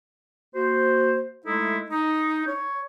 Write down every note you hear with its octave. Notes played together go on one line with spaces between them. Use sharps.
A#3 F#4 C5
G#3 A3 D#4 E4 A4
D#4
C#5